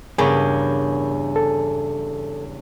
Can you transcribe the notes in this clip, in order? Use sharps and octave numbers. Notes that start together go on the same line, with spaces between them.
E2 G2 C#3 G4 G#4 A#4 B5 C#6
A4